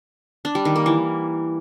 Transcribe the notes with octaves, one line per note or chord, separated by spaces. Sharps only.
D4
G3
D#3
A#3
E3